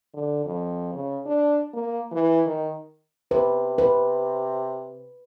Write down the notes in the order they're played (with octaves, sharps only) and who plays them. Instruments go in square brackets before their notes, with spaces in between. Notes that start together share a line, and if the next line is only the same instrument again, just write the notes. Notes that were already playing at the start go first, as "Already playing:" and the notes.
[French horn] D3
F2
C#3
D4
A#3
E3
D#3
[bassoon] C3 [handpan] B4
[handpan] B4